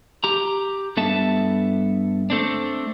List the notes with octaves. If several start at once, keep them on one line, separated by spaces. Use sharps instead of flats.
G4 A#5
G2 B3 A4 E5 A5
A3 C4 D4